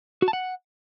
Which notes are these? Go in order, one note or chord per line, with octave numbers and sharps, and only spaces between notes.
F#4
A5
F#5